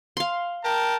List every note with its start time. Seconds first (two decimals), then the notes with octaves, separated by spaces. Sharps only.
0.17 F5 C6
0.64 A#4 G5 A5